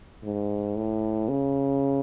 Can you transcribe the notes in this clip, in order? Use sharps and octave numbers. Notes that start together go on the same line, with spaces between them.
G#2
A2
C#3